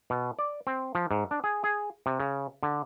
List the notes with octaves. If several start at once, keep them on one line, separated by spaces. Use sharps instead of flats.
B2
D5
C4
F3
G#2
D4
G#4
G#4
C3
C#3
D3